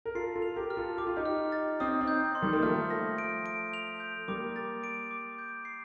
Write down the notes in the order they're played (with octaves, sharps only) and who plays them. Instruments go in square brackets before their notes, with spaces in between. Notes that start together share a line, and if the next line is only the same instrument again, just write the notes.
[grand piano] A#4
[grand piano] F4 A4 [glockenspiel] C7
[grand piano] F4 A4
[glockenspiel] F7
[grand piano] G4 A#4
[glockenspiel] F6
[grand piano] F4 A4
[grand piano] G4 [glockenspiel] D6
[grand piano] F4
D#4 G4
[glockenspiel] F6
A6
[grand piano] C4 D#4 [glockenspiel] D#6
[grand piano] C4 D#4
[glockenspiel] G6
C6
[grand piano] D#3 G3
A#3
[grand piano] F3 A3 [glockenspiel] F6
[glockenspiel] A#6
D7
D7
F7
G6
[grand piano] G3 A#3 [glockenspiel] D6
[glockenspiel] A6
D7
D6
G6
C7